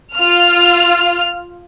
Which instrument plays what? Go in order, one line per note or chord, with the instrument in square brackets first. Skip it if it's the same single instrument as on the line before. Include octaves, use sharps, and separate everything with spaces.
[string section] F4 F6